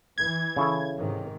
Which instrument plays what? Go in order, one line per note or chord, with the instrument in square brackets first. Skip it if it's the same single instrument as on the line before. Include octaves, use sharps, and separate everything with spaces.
[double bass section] E3 [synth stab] G#6
[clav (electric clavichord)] C#3 E4 A4
[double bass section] G#2 C3 D#3